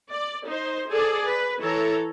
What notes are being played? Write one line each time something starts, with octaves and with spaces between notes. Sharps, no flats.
D5
D#4 C5
G#4 A4 D5
B4
E3 A4 C#5 A#5